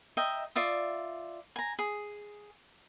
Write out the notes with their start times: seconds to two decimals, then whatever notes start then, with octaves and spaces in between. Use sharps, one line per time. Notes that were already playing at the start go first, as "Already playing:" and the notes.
0.17 D#5 E5 G5 A#5
0.56 F4 D5 E5 D#6
1.56 G#5 A#5
1.79 G#4